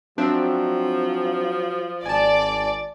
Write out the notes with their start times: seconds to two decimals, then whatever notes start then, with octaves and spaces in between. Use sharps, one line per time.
0.18 F3 F#3 C4 D4 E5
2.05 G#1 D5 G#5 A5